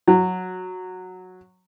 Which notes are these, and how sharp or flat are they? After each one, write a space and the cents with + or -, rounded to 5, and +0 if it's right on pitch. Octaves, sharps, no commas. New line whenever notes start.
F#3 -10